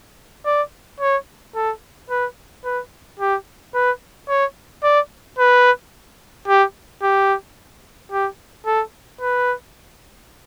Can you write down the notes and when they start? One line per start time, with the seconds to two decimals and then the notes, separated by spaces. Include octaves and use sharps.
0.46 D5
1.00 C#5
1.56 A4
2.10 B4
2.65 B4
3.20 G4
3.75 B4
4.29 C#5
4.83 D5
5.39 B4
6.48 G4
7.03 G4
8.12 G4
8.66 A4
9.21 B4